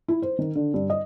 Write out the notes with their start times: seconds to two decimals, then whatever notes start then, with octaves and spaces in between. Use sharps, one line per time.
0.08 E4
0.22 C5
0.39 D#3
0.55 D3
0.74 G2
0.90 D#5